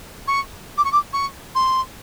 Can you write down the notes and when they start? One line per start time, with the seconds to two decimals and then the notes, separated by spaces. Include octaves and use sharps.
0.27 C#6
0.77 D6
0.84 C#6
0.92 D6
1.13 C#6
1.55 C6